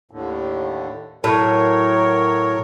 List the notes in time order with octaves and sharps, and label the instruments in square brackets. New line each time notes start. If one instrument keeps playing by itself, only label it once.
[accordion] D#2 A2 D3
[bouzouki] A2 [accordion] F#3 A#4 C#5